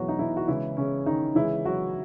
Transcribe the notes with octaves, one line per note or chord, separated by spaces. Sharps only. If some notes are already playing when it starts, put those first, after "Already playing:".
Already playing: B2 E3 F#3 G#3 F#4
D#4
E3 E4
F#4
C#3 E3 G#3 E4
C#3 C#4
D#3 D#4
C#3 E3 G#3 E4
F#3 F#4